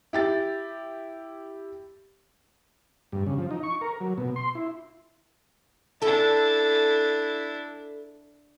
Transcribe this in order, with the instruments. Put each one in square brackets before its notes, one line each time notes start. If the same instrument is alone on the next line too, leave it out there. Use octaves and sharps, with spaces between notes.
[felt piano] E4 G4 A6
[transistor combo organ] G2
C#3
F3
D#4
C#6
A#4
F#3
B2
C6
E4
[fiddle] D4 E4 [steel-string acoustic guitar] A4 A5